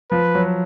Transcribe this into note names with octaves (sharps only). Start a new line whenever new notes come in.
F3 B4
F#3